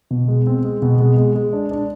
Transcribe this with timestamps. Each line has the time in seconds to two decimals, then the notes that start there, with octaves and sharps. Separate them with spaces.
0.11 B2
0.28 G#3
0.47 C4
0.65 G#3
0.82 B2
1.00 G#3
1.17 G#3
1.35 G#3
1.53 D4
1.71 D4